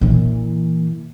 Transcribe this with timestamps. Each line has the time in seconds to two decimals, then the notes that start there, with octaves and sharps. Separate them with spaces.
0.01 A#2 E3